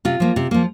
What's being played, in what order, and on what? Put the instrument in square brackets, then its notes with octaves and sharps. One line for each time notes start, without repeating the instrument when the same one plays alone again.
[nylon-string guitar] C3 F4
F3 A#3
C3
F3 A#3